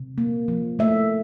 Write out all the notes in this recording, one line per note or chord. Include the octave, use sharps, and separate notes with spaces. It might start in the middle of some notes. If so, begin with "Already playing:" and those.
Already playing: C3
A#3
F3
A3 E5